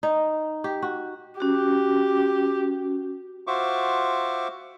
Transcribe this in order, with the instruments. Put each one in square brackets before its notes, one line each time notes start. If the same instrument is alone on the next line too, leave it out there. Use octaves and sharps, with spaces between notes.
[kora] D#4
G4
F#4
[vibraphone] C#4 F#4 [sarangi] G4
[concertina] F4 F#4 C5 E5 C#6 D6